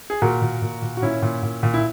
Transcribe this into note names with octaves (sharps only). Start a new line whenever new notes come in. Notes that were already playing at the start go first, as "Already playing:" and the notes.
G#4
A#2 F#4 A#4
A#2
A#2
A#2
F#4
A#2 C#4 E4
A#2
A#2
A#2
E4